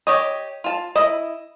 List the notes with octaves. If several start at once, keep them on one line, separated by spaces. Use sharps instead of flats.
G4 C#5 D#5
F4 A5
E4 D#5